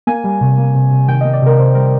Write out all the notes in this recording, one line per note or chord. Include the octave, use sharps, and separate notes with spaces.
A#3 G#5
G3
C3
A#3
C3
C3
D#3 G5
A#3 D#5
D5
C3 A#4
C3 C5
G3 A#4